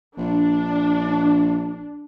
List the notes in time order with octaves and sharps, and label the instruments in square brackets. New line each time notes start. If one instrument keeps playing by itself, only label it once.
[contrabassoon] A#1 [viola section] D4